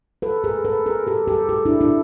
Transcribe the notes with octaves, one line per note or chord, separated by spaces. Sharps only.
A4 B4
G#4 A#4
A4 B4
G#4 A#4
G4 A4
G4 A4
G4 A4
D4 E4
D4 E4